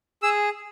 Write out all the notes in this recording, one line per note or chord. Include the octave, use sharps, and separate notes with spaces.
G#4 E6